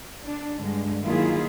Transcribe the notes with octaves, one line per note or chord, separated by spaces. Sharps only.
D4
G2 D3 G#3
D#3 F#3 A#3 E4 F4 G#4